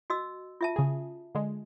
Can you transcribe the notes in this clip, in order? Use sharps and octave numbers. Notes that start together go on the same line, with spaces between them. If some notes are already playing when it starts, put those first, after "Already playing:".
F#4 D#5 E6
F4 E5 A5
C#3 G#4
D3 G#3